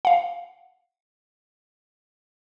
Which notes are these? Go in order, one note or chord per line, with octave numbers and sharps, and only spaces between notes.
F5 F#5